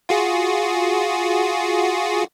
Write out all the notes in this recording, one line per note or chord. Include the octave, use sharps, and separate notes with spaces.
F4 F#4 G#4